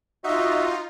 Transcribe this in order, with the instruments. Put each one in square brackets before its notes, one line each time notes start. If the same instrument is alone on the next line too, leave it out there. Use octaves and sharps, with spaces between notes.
[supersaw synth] D#4 F4 [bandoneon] F#4 D#5 E5